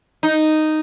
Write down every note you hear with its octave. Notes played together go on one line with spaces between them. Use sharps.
D#4